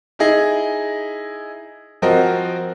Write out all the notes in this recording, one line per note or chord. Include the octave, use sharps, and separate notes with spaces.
D#4 E4 G#4 D#5
F3 C4 F#4 A#4 D#5